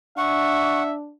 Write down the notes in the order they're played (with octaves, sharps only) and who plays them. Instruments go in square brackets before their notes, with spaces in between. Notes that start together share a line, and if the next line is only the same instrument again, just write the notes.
[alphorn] D4 [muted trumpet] E5 [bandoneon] F#5 [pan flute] C#6